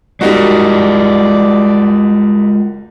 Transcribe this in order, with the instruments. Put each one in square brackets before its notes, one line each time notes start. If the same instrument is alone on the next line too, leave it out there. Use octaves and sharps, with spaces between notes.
[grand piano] G3 D#4 F#4 [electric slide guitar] G#3 F4 A#4 [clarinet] D5